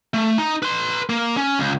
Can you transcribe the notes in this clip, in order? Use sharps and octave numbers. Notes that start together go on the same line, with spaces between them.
A3
D#4
B4 C6
A#3
C#4
C#2